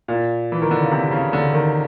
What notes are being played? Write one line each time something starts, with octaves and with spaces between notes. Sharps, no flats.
A#2
E3
D#3
D3
C#3
C3
C#3
D3
D#3